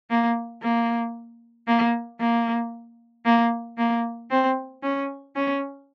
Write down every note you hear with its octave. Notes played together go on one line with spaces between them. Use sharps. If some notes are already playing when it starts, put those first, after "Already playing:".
A#3
A#3
A#3
A#3
A#3
A#3
C4
C#4
C#4